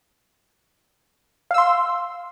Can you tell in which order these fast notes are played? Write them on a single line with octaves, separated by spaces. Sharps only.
F5 E6 C6